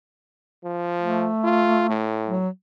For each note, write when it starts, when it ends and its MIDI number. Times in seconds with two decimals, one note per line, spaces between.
0.64 1.27 53
0.99 2.07 57
1.44 1.85 65
1.89 2.38 45
2.27 2.48 54